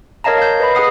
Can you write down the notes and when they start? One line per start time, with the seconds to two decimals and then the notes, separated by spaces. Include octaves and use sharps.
0.24 A#4 C#5 D#5 F5 A5 A#5
0.38 F5 G6
0.60 B4 D#5 B5
0.75 G#4 D#5 F#5 D#6 C7